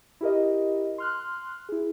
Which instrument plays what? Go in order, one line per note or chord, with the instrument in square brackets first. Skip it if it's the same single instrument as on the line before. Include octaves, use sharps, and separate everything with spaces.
[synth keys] E4 G4 A#4 D#5
C6 F6 F#6
E4 G#4